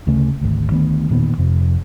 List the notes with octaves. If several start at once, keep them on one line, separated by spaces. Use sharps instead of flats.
D2 C#3 A3
G#1 D2
D2 D#3 B3
E1 A#2 D#3 B3
F2 C3